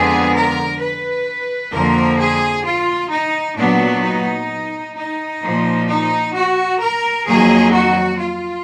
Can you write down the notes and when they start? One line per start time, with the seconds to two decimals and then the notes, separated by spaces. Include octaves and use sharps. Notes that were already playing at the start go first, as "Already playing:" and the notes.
Already playing: F2 D3 G#3 B3 G#4
0.34 A#4
0.80 B4
1.72 F2 D3 F3 A#3 A#4
2.19 G#4
2.65 F4
3.11 D#4
3.57 A#2 F#3 B3 D4
4.03 D#4
4.96 D#4
5.42 A#2 F3 A#3
5.88 D#4
6.35 F#4
6.81 A#4
7.27 F2 D#3 F#3 A#3 G#4
7.73 F#4
8.19 F4